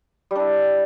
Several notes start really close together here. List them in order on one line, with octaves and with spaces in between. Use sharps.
G3 D4 E4